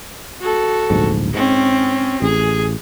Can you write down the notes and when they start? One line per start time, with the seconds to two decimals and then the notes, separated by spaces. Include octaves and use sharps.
0.41 F#4 A4
0.90 D1 A#1 G#2
1.34 G#2 C4 C#4
2.22 A1 G#4